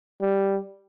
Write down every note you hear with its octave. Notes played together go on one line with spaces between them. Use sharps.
G3